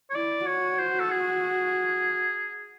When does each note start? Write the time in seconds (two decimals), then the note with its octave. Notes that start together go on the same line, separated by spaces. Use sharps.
0.10 C#5
0.14 E4 D5
0.46 F#4 C#5
0.78 C5
1.00 A4
1.10 G#4